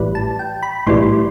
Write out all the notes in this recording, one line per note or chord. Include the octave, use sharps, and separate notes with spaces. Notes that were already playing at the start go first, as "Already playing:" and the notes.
Already playing: A1 A2 G3 B4
A5
G5
B5
B1 A2 E3 G3 C6